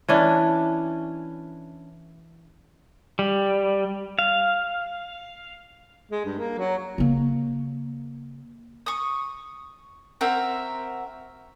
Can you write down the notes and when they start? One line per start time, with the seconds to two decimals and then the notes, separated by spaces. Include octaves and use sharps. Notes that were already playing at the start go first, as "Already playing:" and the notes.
0.08 E3 C#4 D4
3.19 G3
4.19 F5
6.11 G#3
6.25 G2
6.39 A#3
6.58 F#3
6.98 C#3 A#3
8.86 C#6 D#6
10.21 C4 F#4 A#4 E5